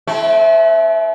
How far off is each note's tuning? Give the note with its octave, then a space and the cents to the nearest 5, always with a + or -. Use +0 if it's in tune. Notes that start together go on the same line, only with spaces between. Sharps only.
A3 -45 C4 +0 E4 +0